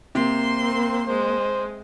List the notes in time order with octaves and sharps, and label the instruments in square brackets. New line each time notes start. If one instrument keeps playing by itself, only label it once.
[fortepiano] C3 [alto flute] A#3 [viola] C5 C6
[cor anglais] C4
[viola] G#3 [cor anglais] C5